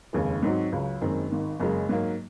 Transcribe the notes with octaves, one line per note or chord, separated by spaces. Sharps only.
F1 D#2 C#3 G#3
G#2 F#3 C4 D#4 F#4
C#2 C#3 F#3
F#1 F#2 D#3 G#3 C4
G#1 G#2 D#3
F#1 F#2 C#3 G#3
G#2 F#3 A#3